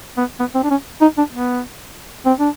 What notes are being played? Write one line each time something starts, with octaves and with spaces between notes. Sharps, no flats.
B3
B3
C4
D4
C#4
D#4
D4
B3
C4
D4